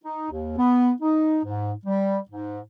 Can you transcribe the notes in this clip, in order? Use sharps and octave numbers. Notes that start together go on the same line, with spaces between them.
D#4
D#2
B3
D#4
G#2
G3
G#2